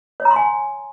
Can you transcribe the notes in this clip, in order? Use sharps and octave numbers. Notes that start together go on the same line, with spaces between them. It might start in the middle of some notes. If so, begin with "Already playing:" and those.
C#5
A#5
C6
G#5